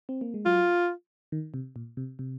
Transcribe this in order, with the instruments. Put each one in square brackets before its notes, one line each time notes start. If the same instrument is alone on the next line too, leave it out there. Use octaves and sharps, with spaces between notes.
[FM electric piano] C4
A#3
G#3
[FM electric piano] F#3 [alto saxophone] F4
[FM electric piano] D#3
C3
A#2
C3
C3